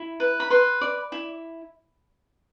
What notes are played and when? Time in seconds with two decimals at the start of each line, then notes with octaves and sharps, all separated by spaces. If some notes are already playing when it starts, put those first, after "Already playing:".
Already playing: E4
0.20 B4
0.40 B5
0.50 B4 C6
0.81 D5
1.12 E4